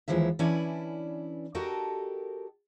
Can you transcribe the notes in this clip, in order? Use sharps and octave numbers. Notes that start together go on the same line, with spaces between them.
D#2 C#3 E3 F3 G#3 E5
E3 C#4 D4 E4 D5 G#5
F#4 G4 A4 A#4 D#5